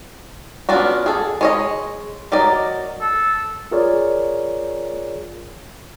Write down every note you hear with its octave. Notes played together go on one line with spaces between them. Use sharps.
B3 C#4 D4 F4 F#4
G#4 A4
G#3 C#5 D#5
F#3 D#4 A#4 D5
A4
F4 G#4 A#4 C#5 D5